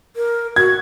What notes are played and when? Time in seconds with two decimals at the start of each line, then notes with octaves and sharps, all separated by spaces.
0.16 A#4
0.56 F#4 G#6